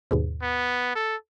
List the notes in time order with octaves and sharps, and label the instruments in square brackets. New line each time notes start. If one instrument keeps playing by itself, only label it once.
[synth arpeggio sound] D#2 G#2 B2
[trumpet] B3
A4